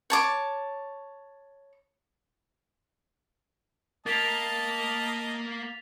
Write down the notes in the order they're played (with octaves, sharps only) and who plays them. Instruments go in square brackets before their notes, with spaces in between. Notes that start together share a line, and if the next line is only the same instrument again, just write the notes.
[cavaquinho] C#5 A5 D6
[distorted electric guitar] A#3 [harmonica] D#5 A5 [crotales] A6 B6 F7